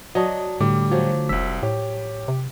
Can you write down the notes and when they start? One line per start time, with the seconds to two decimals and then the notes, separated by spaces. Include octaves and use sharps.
0.15 F#3 D5 D#5 A5 D#6
0.60 A2 D3 G3 A3 D6
0.91 F3 F#3
1.29 F1 C2 E6 B6
1.63 A2 G4 C#5
2.28 C3